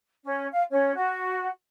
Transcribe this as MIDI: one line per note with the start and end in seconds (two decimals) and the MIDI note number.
0.24 0.46 61
0.52 0.63 77
0.70 0.94 61
0.95 1.47 66